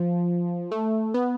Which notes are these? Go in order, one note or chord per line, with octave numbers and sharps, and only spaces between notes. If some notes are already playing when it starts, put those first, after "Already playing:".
Already playing: F3
A3
B3